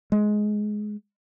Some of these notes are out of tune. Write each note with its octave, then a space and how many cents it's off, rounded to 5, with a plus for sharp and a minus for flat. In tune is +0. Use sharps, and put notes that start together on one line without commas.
G#3 +15